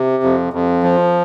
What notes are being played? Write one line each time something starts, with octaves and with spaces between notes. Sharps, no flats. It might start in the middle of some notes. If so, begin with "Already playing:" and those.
Already playing: C3
F2
F2
F3